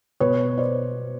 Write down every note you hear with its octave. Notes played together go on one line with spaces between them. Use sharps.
B2 B4 C#5
C5 D5